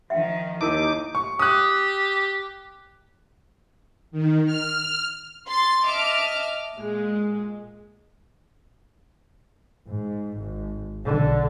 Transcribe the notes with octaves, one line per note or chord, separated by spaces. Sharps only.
D#3 F3 E5 F#5 G5
D#2 D#3 D#4 E4 A#4 D6 E6
C#6
G4 D#6 F#6
D#3
F6
C6 A6
D#5 E5 A5 D6 F6
A#2 G#3
G#2
G#1
B1 D3